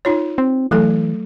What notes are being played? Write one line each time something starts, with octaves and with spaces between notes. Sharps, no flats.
D#4 F4 C#5
C4
E3 F#3 A3 A4